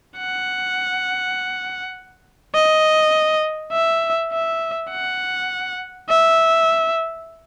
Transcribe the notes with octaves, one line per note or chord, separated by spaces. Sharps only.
F#5
D#5
E5
E5
F#5
E5